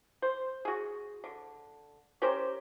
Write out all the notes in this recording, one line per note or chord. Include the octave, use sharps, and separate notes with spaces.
C5
F#4 G#4
D3
C#4 G4 A#4 C5